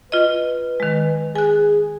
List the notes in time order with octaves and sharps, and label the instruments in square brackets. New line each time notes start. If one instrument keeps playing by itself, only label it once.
[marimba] F4 D#5 [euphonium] B4
[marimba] D#3 G#3
[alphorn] G#4 [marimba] G#5 F#6